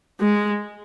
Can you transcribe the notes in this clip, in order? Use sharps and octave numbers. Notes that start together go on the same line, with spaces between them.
G#3